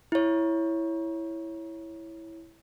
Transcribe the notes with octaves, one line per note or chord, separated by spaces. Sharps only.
E4 C#5